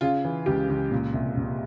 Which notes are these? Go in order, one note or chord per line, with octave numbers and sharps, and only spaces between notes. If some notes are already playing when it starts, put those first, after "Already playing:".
C#3 F4
E3
C#2 G4
C#2
A#2
C2
A#2